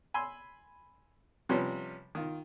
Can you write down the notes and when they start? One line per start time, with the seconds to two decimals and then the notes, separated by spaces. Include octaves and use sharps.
0.14 G#5 B5 C6 E6
1.49 C3 F3 G3 B3 C#4
2.15 D#3 F4